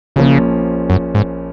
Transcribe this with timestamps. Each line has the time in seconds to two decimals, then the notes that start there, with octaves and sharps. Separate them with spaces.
0.16 A#1 A#2 C#3 F3 A#3 C#4
0.90 F#2
1.15 G#2